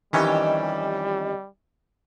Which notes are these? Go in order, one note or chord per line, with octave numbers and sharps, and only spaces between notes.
F2 D#3 E3 G3 C#4 G4 C#5